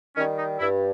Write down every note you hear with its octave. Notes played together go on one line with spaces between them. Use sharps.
D#3 G3 C#4
D#4
G2 E4